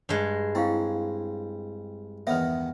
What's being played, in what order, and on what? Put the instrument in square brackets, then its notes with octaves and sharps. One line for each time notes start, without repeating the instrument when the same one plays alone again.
[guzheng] G2 G#3
[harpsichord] C4 [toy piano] E4 G4 F5
[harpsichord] E2 D#3 B3 [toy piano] B4 E5